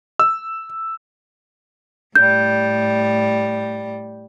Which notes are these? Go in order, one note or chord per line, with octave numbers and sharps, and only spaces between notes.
E6
A2 G3 G6